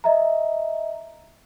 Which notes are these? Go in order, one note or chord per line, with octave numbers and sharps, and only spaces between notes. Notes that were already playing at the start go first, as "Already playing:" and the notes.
D#5 E5 A#5